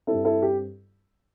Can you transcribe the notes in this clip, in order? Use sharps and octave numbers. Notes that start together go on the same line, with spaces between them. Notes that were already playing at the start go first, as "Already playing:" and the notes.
G2 G3 C4 E4 A4
E4 A4
G4